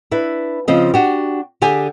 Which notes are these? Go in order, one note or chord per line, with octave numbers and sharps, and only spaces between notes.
D4 E4 B4
C#3 F3 C4 D#5
D4 F#4 G4
D3 G4 G#4 G#5